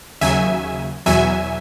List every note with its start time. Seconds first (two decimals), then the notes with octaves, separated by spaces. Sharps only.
0.21 D#2 C#3 F#3 E5 G#5
1.06 E2 B2 F#3 E5 G#5